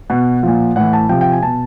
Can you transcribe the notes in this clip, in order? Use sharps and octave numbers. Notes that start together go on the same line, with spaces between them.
B2 F#5
A#2 F3
A2 E3 F#5
A5
C3 F3 G5
G5
G#5
B2 A5